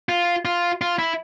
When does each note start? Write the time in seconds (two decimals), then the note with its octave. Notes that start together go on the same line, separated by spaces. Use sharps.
0.09 F4
0.45 F4
0.81 F4
0.99 E4